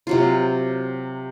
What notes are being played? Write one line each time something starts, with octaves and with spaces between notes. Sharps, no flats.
C3 F#3 F4